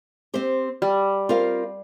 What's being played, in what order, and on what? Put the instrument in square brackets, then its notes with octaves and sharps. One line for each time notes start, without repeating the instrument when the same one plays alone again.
[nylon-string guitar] C4 G4 C5
[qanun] G3
[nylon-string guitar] C4 F4 A#4 F5